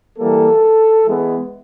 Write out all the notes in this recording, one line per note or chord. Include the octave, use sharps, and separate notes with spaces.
E3 G3 A#3 A4
E3 G#3 B3